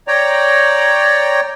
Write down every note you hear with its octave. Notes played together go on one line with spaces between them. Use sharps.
C#5 D5 G5 A#5